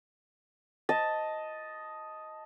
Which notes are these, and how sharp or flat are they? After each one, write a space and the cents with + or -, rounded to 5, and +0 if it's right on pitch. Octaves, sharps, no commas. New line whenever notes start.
D#5 +5 A5 +0